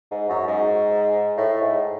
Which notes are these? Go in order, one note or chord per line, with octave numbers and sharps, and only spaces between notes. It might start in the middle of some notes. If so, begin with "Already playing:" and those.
G#2
F#2
G#2
A2
G#2